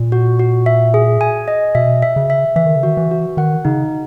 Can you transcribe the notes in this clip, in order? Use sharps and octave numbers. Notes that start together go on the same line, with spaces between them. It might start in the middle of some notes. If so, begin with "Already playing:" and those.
Already playing: A#2
F#4
F#4
E5
G#4
G#5
D#5
B2 E5
E5
C#3
E5
E3 E5
D#3
C#3
D#3 F#4
E3
F#4
D#3 F#5
C#3 D#4